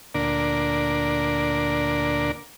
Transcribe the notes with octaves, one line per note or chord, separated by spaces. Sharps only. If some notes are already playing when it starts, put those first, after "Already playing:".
D2 A#2 D3 D4 A#4